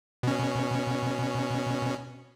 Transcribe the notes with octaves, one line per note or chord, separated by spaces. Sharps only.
B2 C#4